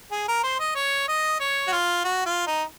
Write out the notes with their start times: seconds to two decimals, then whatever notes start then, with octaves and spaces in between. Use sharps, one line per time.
0.12 G#4
0.28 A#4
0.43 C5
0.60 D#5
0.75 C#5
1.08 D#5
1.40 C#5
1.67 F#4
1.72 F4
2.05 F#4
2.26 F4
2.47 D#4